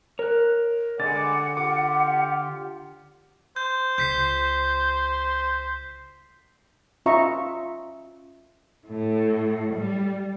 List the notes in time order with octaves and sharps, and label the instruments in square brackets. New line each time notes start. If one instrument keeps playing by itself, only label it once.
[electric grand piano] A#4 [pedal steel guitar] C#5 F#6
[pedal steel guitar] D3 [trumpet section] G3 G#3 D5 [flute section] F#5 [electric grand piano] A6
[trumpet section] F4 G4 [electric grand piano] D6
[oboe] C5 [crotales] G6
[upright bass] C#2 [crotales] G6 B6 C7
[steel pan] C#4 F4 D#5 E5 A#5 C#6
[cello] A2
G3